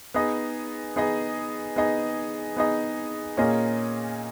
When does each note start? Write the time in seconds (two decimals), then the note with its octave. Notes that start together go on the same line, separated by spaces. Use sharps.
0.14 B3 D#4 G#4 D#5
0.96 B3 D#4 G#4 D#5
1.76 B3 D#4 G#4 D#5
2.56 B3 D#4 G#4 D#5
3.37 A#2 A#3 C#4 G#4 D#5